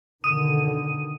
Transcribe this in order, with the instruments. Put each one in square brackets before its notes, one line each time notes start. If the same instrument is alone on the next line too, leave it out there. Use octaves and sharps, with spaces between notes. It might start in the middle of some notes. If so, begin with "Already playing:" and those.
[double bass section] B2 D3 D#3 [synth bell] D#6 D#7